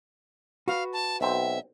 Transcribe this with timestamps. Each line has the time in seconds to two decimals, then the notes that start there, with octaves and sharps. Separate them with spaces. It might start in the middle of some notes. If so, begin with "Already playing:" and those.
0.68 F#4 B4 F5
0.93 A5
1.21 B1 C4 E5